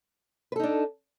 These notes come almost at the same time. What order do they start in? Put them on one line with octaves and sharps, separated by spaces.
B4 A4 D#4 D4